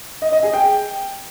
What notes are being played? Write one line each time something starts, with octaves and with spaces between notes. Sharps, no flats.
D#5
D#5
G#4
G5